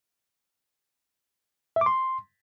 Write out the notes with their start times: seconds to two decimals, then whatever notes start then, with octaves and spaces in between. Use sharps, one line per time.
1.76 E5
1.81 D6
1.86 C6